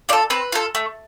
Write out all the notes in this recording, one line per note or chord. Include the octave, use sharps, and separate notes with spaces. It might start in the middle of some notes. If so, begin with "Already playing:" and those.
F4 A4 D5
C4 B4
F4 A4
A3